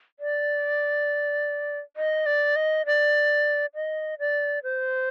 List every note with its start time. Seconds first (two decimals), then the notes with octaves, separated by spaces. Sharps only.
0.20 D5
1.97 D#5
2.26 D5
2.56 D#5
2.86 D5
3.75 D#5
4.19 D5
4.63 C5